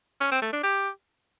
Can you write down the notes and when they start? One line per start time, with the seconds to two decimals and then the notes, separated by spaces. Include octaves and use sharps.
0.21 C#4
0.31 C4
0.42 A3
0.53 D4
0.63 G4